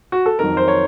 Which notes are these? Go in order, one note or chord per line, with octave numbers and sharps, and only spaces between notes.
F#4
A4
F2 D#3 F#3 A#4
C5
C#5